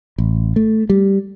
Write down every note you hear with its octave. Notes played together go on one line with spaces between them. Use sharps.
A1
A3
G3